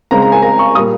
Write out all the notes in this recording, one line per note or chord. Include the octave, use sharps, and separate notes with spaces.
C#3 G#3 C4 A#5
A#5
G#5
A#5
C#6
A#2 G3 A#3 D#6